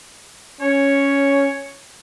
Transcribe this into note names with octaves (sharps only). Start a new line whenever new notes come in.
C#4 C#5